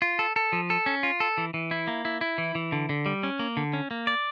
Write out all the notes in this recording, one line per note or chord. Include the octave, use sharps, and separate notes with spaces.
F4
A4
A4
F3
A4
C#4
F4
A4
E3
E3
E4
A#3
E4
E4
E3
E3
D3
D3
G3
C#4
A#3
D3
C#4
A#3
D5